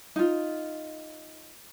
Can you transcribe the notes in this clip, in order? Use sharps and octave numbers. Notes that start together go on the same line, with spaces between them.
D#4 F4